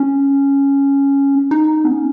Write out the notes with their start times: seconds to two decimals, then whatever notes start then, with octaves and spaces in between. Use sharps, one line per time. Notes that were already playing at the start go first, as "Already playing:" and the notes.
Already playing: C#4
1.51 D#4
1.85 B3
1.91 C#4